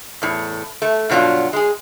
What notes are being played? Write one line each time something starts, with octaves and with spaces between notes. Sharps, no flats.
E2 A2
A3
G2 B2 F#3 D4 F4
G#3 G#4